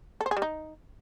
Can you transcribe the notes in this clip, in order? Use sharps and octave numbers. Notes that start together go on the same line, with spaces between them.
A4
C5
G#4
G3
D#4